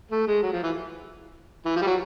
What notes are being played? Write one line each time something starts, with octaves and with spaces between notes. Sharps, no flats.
A3
G#3
F#3
F3
E3
E3
F3
G3
F#3